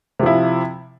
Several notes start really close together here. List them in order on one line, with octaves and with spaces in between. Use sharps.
C3 F3 E4